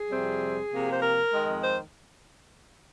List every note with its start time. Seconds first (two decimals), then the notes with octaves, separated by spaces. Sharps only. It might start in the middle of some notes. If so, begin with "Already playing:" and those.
Already playing: G#4
0.09 F2 C3 G3 C4
0.71 C3 F3 A#3
0.91 C5
1.02 A#4
1.32 F2 D#3 G#3
1.64 C5